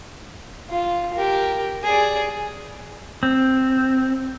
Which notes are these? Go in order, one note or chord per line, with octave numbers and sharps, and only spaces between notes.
F4
G4 A#4
G#4 D5
C4